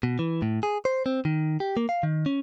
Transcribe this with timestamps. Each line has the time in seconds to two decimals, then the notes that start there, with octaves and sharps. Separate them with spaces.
0.03 B2
0.19 E3
0.42 A2
0.63 G#4
0.85 C5
1.06 C4
1.25 D#3
1.60 G4
1.77 A#3
1.89 F5
2.03 D#3
2.26 C#4